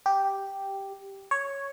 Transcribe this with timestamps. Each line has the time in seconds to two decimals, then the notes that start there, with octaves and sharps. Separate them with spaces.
0.06 G4
1.31 C#5